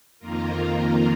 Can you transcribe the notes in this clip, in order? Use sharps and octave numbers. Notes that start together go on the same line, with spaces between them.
F2 D#3 A#3 F4 A#4